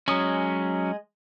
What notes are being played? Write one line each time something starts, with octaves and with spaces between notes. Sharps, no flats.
F#3 G#3 C#4 D#6